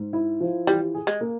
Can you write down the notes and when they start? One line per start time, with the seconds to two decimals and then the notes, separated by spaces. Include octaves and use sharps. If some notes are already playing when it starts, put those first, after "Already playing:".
Already playing: G#2
0.13 E4
0.41 F3
0.67 E3 G3
0.94 G#4
1.07 G#3
1.21 A#3